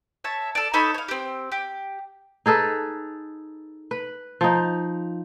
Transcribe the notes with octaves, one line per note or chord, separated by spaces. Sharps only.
C#5 E5 A5
A4 D5
D#4 A4 C#5 B5
C#5 F5
C4 G4
G4
D#4 G#4 A4 B4
B4
F3 D#4